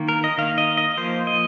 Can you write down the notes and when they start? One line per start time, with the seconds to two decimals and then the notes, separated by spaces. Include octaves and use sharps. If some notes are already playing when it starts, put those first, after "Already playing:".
Already playing: D#3 A#3
0.09 A#4
0.24 D#5
0.38 D#3 A#3 F5
0.58 D#5
0.77 D#5
0.97 F3 A#3 C5
1.27 D#5